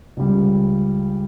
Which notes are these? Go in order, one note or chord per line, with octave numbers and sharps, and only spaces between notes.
C#2 C#3 G3